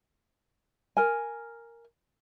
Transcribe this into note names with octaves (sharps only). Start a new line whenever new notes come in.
A#4 G#5